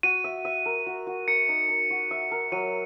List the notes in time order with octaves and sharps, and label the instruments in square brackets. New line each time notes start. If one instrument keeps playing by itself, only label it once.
[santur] F#4 [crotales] D#7
[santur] E5
E5
A#4
F#4
F#4
[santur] A#4 [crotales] C#7
[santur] D#4
A#4
F#4
E5
A#4
[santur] F#3 [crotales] D#7